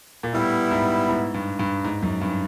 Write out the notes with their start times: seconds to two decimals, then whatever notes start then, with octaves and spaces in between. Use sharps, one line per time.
0.23 A#2
0.34 A2 G3 B3 E4
0.71 G#2
1.09 G#2
1.34 G2
1.59 G2
1.84 G#2
2.02 F#2
2.21 G2